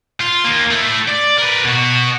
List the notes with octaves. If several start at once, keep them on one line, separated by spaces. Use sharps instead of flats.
F4
D#3 A#3
A3 E4
D5
A#4 B4
B2 F#4